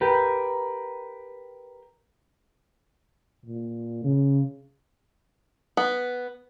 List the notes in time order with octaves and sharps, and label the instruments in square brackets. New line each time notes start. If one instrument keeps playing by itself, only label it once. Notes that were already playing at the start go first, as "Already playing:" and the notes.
[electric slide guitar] G4 A#4 B4
[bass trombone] A#2
C#3
[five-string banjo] B3